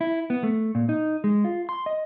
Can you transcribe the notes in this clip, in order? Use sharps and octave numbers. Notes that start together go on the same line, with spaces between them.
E4
B3
A3
A#2
D#4
G#3
F4
C6
D#5